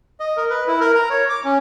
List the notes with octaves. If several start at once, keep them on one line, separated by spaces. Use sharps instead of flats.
D#5
A#4
B4
E4
A#4
A#5
C#5
D6
C#4